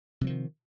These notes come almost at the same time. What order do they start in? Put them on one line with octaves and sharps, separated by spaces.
C3 F#3 F3 D#3